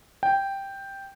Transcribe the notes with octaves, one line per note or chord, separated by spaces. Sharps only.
G5